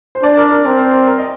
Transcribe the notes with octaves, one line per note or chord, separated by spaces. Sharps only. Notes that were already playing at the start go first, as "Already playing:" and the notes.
C5
D4 D5
A#4
A#4
C4 A#4
C5
A#4
A#4
D#5